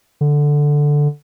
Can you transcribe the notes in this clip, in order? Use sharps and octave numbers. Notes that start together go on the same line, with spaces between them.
D3